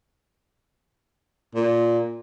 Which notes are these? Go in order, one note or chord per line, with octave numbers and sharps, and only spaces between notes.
A#2